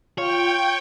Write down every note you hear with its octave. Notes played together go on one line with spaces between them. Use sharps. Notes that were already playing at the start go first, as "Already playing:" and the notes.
F4 C#5 G5